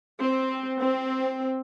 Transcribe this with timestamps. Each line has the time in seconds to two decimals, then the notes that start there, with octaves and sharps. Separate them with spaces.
0.19 C4
0.81 C4